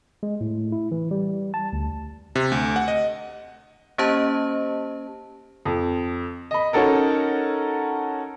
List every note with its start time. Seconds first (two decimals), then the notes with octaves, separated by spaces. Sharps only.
0.23 G#3
0.41 A2
0.72 E4
0.91 E3
1.11 G3
1.54 A5
1.73 D2
2.35 C3
2.52 D2
2.76 F#5
2.88 D#5
3.98 A#3 C#4 G4 C5 D#5 A5
5.65 F2
6.51 D#5 B5
6.73 C#4 D#4 F#4 A4 A#4